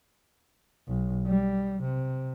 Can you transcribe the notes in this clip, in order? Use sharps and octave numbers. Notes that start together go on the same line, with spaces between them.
B1
G3
C3